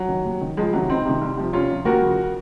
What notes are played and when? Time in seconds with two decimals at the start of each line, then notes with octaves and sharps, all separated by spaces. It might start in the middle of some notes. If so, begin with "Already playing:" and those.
Already playing: F#3
0.08 D#3
0.25 D#2
0.41 D#3
0.57 C#2 F3 G#3
0.73 C3 D#3 F#3
0.89 C#2 C4 D#4
1.05 C3 D#3
1.21 C2
1.37 C3 F3
1.53 C2 C#4 F4
1.70 C3 F3
1.85 D#2 F#4 A#4
2.02 C#3 F3